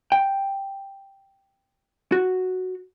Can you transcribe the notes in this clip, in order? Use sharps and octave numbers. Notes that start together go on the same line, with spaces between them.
G5
F#4